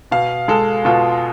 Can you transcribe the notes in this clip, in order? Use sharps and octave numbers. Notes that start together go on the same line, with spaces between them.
B2 F5
G#3 A4
B2 F4